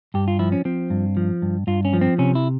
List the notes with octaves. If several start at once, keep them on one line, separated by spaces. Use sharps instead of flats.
G2 G4
F4
F3 E4
C#4
F3 C4
G2
F3
G2
G2 F4
C#4
F3
C4
C3 C#4
E4